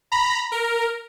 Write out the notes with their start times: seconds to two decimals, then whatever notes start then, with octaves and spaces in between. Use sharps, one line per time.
0.12 A#5 B5
0.52 A#4